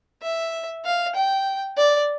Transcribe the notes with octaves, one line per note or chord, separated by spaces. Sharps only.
E5
F5
G5
D5